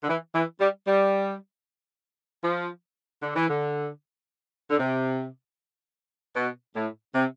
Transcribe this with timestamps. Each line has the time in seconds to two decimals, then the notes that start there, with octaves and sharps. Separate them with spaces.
0.04 D3
0.09 E3
0.35 E3
0.61 G3
0.87 G3
2.44 F3
3.23 D3
3.36 E3
3.49 D3
4.71 D3
4.79 C3
6.36 B2
6.76 A2
7.15 C3